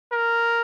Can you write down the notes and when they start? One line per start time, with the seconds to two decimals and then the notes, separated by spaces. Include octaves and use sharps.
0.12 A#4